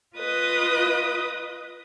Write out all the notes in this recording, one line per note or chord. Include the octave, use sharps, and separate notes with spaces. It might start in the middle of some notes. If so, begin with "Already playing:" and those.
F4 B4 D#5 D#6